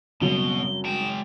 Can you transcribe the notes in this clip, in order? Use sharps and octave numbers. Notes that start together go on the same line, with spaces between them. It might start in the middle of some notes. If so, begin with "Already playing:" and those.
F#1 B2 F#3 G3 C4 C#4 G7
G#3 G5 E7